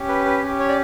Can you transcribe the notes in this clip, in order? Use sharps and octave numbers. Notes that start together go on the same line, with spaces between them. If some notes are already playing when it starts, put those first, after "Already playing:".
Already playing: C#4 G4
B4
B4
C#4 G4
C#5
D5